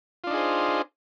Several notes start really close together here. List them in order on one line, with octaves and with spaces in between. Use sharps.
F4 D4 D#4 G#4 C5